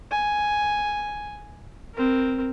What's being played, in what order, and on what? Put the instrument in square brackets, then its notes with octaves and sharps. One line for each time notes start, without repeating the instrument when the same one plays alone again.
[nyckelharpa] G#5
C4 A#4